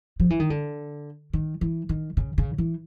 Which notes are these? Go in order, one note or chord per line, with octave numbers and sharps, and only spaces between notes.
F3
E3
D#3
D3
D#3
E3
D#3
C#3
C#3
E3